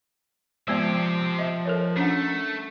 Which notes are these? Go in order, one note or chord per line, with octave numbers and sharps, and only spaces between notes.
F3 G#3 B3 C4 G4 D5
D#5 E5
A4 A#4 C#5
A3 C#4 D4 F#5